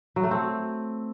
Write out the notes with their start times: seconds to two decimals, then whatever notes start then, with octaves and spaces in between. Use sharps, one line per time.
0.16 F#3
0.24 A3
0.31 C4